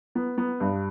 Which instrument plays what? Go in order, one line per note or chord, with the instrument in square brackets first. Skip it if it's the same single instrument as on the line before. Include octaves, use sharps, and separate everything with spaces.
[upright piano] B3
B3
G2